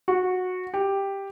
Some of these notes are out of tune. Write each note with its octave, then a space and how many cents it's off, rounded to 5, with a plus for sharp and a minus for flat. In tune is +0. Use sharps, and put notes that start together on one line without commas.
F#4 -15
G4 +5